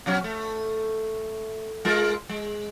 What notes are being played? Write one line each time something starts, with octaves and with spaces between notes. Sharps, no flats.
B2 F#3 C#4
A3
G#3 F4 A#4
G#3